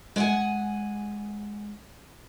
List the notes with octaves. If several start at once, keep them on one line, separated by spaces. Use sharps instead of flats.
G#3 F#5 G#5